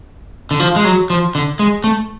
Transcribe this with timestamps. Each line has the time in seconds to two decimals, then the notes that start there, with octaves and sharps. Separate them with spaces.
0.51 D3
0.60 F3
0.76 G#3
0.85 F#3
1.10 F3
1.35 D3
1.59 G#3
1.84 A3